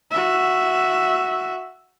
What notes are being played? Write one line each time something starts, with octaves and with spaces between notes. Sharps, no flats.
F#4 E5